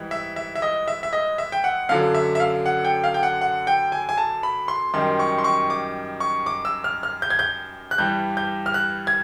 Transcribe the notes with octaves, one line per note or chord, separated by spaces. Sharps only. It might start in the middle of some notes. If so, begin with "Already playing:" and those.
Already playing: G#2 E3 G3
E5
E5
E5
D#5
E5
E5
D#5
E5
G5
F#5
F#2 D3 F#3 F5
E5
E5
F5
F#5
G5
F5
G5
F#5
F#5
G5
G#5
G#5
A5
B5
C6
F#2 D#3 G3 C6
C#6
C6
C#6
D6
C#6
D6
E6
F6
F6
G6
G#6
G6
F#6
G2 E3 G3 G6
G6
F6
F#6
G#6